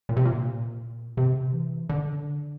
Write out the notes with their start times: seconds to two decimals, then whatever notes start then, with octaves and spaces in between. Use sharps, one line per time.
0.09 A#2
0.17 C3
0.25 A#2
1.17 C3
1.53 E3
1.90 D3